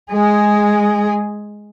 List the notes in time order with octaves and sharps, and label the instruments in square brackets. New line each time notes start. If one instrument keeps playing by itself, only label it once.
[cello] G#3 G#4